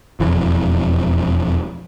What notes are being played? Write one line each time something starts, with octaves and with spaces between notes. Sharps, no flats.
E1 F2 E3